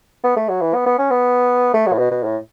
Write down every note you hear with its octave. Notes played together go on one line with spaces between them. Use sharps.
B3
A3
F#3
E3
B3
B3
C#4
B3
A3
F#3
A2
B2
B2
A2